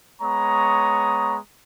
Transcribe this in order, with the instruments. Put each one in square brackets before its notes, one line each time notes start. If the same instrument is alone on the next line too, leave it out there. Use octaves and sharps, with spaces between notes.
[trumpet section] G#3 B3 C#5 A#5 C#6 D#6